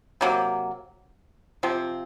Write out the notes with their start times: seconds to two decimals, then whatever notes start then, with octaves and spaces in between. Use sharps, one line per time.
0.21 C3 F#3 A#3
1.63 C3 F3 C4